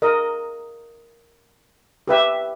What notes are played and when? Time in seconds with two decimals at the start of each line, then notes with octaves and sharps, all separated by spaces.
0.02 A#4 D#5
2.08 G4 B4 E5